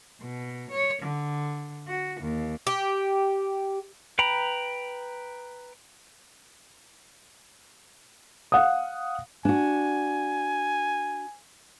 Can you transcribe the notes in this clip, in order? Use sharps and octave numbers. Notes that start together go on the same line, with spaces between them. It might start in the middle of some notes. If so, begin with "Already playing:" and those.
B2
C#5
D3
F#4
D#2
G4
B4 G5 A#5 B5
F5 F#5 D#6
D4 F#4 G#5